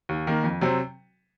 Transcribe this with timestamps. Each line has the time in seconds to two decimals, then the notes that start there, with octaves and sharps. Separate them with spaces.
0.09 D#2
0.27 D#3 A#3
0.44 F2
0.61 C3 F#3 C4